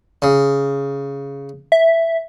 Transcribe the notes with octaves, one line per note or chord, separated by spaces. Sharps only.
C#3
E5